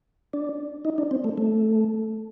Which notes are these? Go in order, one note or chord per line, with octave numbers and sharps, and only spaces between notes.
D4
D#4
D4
C4
A3
A3